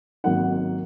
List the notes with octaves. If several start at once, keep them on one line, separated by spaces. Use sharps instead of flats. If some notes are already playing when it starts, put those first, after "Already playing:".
G#1 G#2 F#3 A#3 D#4 F#5